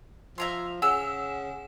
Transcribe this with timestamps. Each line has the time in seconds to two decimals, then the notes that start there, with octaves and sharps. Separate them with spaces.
0.38 F3 E5 A#5 C6
0.82 C#3 F#5 G#5 E6 E7